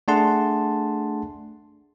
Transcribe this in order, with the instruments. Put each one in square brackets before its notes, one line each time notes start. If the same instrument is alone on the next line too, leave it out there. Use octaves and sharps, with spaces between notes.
[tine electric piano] A3 D4 G#4 F#5 A5 C6